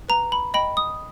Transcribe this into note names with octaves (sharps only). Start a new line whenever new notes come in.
B4 A#5
B5
D#5 G5 B5
D#6